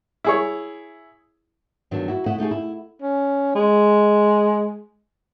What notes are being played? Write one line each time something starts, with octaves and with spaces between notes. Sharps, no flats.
E4 G#4 C#5
E2 G2 D#3 F#3 D4
E4 F#4
A3 E4 D#5 F#5
A3 D#4 G4 G#4
E4
C#4
G#3